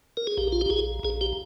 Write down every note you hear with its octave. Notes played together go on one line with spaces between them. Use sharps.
A#4
G#4
A#1 G4
F4
G4
A#1 G#4
A#1 G#4
G4